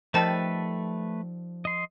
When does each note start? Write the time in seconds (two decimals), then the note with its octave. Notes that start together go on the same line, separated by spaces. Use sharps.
0.14 D#3 F3 G3 A3 A4 B4 C5 A5
1.65 D#5 C6